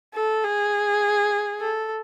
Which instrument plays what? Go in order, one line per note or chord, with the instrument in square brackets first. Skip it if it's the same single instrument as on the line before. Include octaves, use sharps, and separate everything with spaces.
[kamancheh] A4
G#4
A4